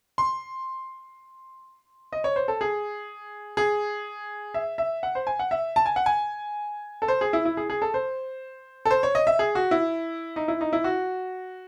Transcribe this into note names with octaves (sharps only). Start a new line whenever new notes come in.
C6
D#5
C#5
C5
A4
G#4
G#4
E5
E5
F#5
C5
G#5
F#5
E5
A5
G#5
F#5
G#5
A4
C5
G#4
E4
E4
G#4
G#4
A4
C5
A4
C5
C#5
D#5
E5
G#4
F#4
E4
D#4
E4
D#4
E4
F#4